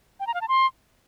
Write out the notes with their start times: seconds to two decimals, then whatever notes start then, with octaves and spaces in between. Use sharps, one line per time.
0.20 G5
0.27 A#5
0.34 F5
0.41 A5
0.48 C6